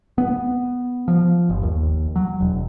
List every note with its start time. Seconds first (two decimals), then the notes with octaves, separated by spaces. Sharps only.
0.18 B3
1.08 F3
1.49 G1
1.63 D#2
2.16 F#3
2.41 E1